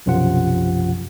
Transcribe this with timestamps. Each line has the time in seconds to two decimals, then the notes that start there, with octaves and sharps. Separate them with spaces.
0.06 B1 F#2 C3 F3 F4 F#5